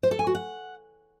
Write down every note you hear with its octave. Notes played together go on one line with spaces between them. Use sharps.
C5
A4
G#5
F#4
F#5